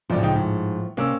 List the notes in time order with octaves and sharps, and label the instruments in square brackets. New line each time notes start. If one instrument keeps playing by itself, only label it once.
[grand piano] E1 C#3 D5 [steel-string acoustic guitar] A2 F3
[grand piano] C#2 D#4 G5
G#2
[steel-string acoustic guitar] C3 D5 [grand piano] A#3 C#4 E6